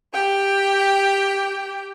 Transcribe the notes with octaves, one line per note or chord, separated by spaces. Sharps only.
G4 G5